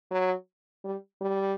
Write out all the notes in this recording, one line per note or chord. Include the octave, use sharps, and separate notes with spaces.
F#3
G3
G3